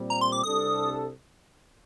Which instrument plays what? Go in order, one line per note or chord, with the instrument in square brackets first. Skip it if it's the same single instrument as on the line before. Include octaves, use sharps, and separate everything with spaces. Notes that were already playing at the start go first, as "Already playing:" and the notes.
Already playing: [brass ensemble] A#2 G3 C4
[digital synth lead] A#5
C6
D6
[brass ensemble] C2 C3 G3 D4 A4 [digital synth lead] D#6